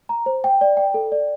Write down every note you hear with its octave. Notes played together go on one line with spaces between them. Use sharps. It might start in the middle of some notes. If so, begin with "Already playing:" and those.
A#5
C5
G5
D5
G5
A4
D5